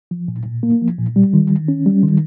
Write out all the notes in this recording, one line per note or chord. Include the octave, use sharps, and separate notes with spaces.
F3
A#2
A#2
A#3
F3
A#2
G3
D#3
D#3
C#4
G3
D#3